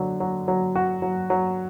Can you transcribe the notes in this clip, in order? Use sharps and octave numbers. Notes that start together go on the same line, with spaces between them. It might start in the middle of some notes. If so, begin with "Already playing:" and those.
Already playing: D3 F#3
F#3
F#3
F#4
F#3
F#3